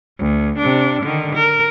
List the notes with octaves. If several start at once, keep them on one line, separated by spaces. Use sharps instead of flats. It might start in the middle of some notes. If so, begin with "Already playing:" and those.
D2
C3 D4
D3 D#3
A#4